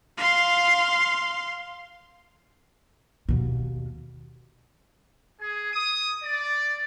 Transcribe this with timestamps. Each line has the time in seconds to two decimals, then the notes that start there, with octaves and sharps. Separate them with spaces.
0.18 F5 C6
3.29 D#2 B2
5.40 G#4
5.72 D#6
6.22 D5